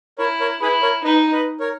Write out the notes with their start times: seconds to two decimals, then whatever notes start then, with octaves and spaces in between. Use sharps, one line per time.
0.19 E4 A#4 C#5
0.40 A#4 C#5
0.62 E4 G#4 B4
0.82 A#4 C#5
1.04 D#4 B4 D#5
1.32 B4 D#5
1.60 A#4 C#5